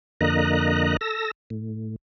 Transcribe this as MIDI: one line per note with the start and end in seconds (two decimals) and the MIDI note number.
0.21 0.97 41
0.21 0.97 50
0.21 0.97 58
0.21 0.97 75
0.21 0.97 82
0.21 0.97 90
1.01 1.31 69
1.01 1.31 88
1.01 1.31 94
1.50 1.96 45